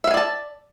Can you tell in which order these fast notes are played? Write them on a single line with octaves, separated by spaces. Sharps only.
E5 F5 G#5 D5 A5